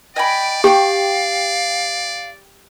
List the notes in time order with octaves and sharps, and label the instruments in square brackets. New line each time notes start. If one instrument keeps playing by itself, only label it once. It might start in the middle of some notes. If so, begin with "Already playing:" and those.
[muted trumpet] D5 [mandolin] D#5 G#5 B5 [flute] G5
[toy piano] G4 [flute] F5 [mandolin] G5 C#6 D6